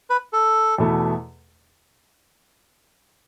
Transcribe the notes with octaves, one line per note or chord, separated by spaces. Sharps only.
B4
A4
E2 B2 A3 E4 A4